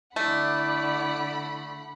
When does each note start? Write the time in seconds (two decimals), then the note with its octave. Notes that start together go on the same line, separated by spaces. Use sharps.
0.16 D3 A3 E4 D5 F#5 B5